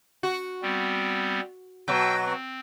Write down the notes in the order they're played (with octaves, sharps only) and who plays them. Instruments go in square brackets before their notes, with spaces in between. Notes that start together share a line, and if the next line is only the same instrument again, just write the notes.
[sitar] F#4
[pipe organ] G3 B3 C4
[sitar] B2 F#3 [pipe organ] G5 E6 G6
[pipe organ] C4